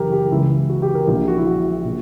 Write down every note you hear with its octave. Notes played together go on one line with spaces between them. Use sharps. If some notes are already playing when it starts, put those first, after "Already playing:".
Already playing: F#1 E3 G4 A#4
G4
C#2 C#3 E3 E4
F#4
G4
A#4
A#1 A#2 G4
F#4
E4
F#4
A#2